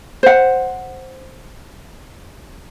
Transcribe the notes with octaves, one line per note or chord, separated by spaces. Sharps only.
C5 F#5